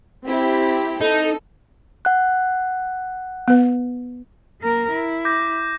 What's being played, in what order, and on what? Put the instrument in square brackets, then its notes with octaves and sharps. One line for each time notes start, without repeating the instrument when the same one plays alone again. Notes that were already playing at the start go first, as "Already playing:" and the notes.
[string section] C4 E4 G4
[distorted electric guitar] D#4 [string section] A4
[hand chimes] F#5 F#6
[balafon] B3 B4
[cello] A#3 A#4
E4
[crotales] D6 G6 A#6